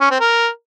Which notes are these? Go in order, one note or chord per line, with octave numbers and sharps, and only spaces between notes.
C#4
C4
A#4